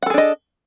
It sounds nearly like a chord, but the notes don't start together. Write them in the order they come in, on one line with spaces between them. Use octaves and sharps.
F#5 A4 G#4 D4 D#5